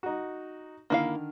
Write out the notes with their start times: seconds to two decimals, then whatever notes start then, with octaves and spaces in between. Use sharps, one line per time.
0.03 D#4 F#4
0.90 D3 D#3 A#3 E4 F5 F6